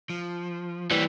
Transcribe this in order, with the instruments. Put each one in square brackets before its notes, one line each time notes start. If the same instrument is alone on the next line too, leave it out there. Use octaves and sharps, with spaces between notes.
[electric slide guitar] F3
[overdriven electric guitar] E3 G3